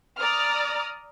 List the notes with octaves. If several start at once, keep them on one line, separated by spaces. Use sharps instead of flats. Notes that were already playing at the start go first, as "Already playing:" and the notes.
D5 A#5 D#6 F6